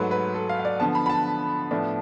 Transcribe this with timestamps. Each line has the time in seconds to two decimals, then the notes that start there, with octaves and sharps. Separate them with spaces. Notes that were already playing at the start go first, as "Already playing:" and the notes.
Already playing: G#2 F#3 A3 B4
0.11 B4
0.34 A4
0.49 F5
0.60 F5
0.65 D5
0.80 D3 F3 B3 A5
0.95 B5
1.06 B5
1.10 A5
1.71 A2 F3 B3 D4